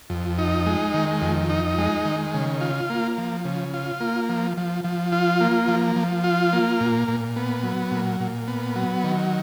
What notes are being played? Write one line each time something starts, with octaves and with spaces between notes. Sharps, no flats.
F2
D#4
G#3
D#3
F2
D#4
G#3
D#3
C#3
F4
A#3
F3
C#3
F4
A#3
F3
F3
F3
F4
A#3
F3
F3
F4
A#3
A#2
A#2
B3
F#3
A#2
A#2
B3
F#3
D#3